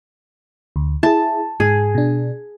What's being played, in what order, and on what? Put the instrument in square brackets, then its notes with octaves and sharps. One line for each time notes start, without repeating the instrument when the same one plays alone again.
[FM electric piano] D2
[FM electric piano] E4 G#4 [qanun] A5
[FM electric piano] G#2 [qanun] G#4
[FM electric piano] B2 D4